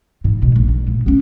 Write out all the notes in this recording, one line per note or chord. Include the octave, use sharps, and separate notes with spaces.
G#2 E3
B1 B2
A#1
D3
A#2
B3 C#4